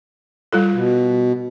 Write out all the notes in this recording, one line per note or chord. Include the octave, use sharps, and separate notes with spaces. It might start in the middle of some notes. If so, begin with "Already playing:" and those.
G3 F4 A4
B2